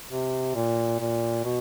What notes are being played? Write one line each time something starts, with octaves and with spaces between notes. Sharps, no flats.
C3
A#2
A#2
B2